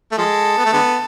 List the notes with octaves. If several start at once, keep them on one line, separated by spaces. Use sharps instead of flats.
A3
F3 G#3 A4
B3
A3
D3 G#3 B3